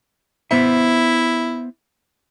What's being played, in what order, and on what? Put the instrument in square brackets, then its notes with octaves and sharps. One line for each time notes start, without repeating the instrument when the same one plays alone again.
[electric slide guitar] B3 C5 E5 [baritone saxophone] E4